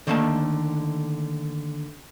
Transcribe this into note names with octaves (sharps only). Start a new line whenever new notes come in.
D3 D#3 A3 A#3 D#5 A5